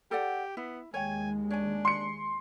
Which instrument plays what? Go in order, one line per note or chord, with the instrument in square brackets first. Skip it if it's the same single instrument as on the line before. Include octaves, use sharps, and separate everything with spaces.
[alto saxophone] G4 [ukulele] A4 D5 F#5
[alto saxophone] B3 [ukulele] E4
[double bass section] D#2 G#3 [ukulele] C#5 G5 [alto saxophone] G#5
[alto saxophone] D4 [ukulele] C#5 G#5
[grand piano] C6 C#7